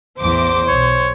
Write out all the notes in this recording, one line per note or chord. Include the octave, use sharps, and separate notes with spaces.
A1 E2 C5 D6
B1 C#5